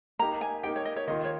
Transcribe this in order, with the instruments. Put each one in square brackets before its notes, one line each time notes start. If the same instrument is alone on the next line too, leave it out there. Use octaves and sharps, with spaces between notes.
[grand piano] A#3 D#4 G4 [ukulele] A#5
[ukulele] G#5
[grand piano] A#3 D#4 G4 [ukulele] G5
[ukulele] C#5
D#5
C#5
[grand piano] D#3 A#3 F4 [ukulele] D#5
[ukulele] C#5